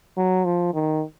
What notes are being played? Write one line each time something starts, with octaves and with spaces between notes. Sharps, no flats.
F#3
F3
D#3